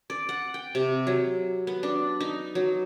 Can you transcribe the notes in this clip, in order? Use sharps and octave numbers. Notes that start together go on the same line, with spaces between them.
D5
F#5
G5
C3
F#3
B3
D4
D#4
F#3